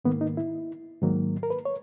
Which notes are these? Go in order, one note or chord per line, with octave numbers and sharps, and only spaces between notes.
G#2 D#3 A#3 B3
D#4
E4
G#2 D#3 F#3 A#3
A#4
B4
C#5